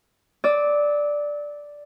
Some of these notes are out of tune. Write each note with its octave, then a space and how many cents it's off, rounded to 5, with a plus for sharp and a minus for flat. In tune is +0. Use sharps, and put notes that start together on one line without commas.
D5 +0 E6 -35